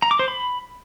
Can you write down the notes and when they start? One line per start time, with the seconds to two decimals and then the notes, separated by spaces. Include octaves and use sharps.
0.02 A#5
0.11 D6
0.19 C5
0.28 B5